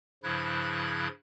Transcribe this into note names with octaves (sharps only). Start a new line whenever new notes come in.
G2 C#3 F3 E4 F#6 G#6